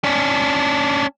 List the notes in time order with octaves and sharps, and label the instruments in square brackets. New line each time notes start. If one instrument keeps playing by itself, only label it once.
[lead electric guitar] C#4 D4